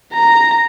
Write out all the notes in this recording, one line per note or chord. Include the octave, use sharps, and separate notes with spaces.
A#5